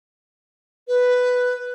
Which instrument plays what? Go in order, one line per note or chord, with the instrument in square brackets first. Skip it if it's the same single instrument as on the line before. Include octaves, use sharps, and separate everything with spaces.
[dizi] B4